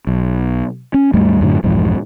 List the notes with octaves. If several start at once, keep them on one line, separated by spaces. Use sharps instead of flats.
B1
C#4
D#2 G#2 G3 A3
F#2 A2 D3
B1 F2 G#2 E3